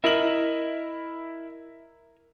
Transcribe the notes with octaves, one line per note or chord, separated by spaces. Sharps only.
E4 A#4 D#5 E5 F#7